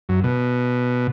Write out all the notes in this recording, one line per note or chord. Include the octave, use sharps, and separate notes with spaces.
F#2
B2